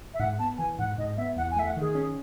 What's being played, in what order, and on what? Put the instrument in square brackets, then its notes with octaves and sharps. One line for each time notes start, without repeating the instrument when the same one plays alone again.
[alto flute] E5
[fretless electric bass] G#2 [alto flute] F#5
[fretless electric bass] B3 [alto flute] A5
[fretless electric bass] E3 [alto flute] G#5
[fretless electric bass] G#2 [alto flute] F#5
[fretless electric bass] G#2 [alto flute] D#5
[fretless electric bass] B3 [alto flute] E5
[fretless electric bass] E2 [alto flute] F#5
[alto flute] G#5
[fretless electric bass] A3 [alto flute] E5
[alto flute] F#5
[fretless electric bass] D#3 [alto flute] G#4
[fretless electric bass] C#4